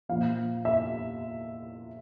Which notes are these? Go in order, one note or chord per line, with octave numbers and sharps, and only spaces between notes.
A#2 F3 F5
E5